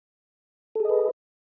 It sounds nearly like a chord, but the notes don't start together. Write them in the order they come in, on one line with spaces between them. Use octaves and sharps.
A4 G#4 D#5 B4